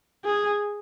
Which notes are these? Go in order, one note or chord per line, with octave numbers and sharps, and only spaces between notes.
G#4